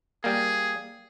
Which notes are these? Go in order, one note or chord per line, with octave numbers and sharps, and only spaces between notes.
G3 A#3 G#4